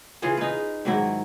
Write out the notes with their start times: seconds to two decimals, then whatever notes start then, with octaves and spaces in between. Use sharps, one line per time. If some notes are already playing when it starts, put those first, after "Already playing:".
0.22 C#3 E3 F4 G#4
0.37 D#4 B4
0.85 G#2 D#3 F#3 E4